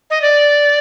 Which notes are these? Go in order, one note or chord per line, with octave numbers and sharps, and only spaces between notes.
D#5
D5